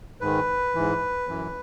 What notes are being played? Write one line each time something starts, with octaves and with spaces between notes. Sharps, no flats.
G#2 D#3 B4
G#2 E3
F#2 E3